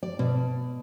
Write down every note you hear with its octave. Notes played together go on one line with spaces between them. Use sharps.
D5
B2